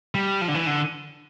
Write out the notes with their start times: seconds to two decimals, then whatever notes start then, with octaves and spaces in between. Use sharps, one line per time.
0.15 G3
0.41 F3
0.48 D3
0.54 E3
0.67 D3